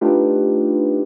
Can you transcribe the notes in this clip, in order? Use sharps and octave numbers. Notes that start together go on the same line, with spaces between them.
A3 D4 D#4 F4 G4 B4